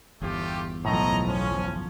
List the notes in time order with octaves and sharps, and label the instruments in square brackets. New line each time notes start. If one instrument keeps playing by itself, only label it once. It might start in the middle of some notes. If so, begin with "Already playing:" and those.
[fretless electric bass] G1 E2 [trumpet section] A3 F4 G4
[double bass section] B1 F3 [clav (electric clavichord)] A2 A3 [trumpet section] C#5 D#5 A#5
[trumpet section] C#4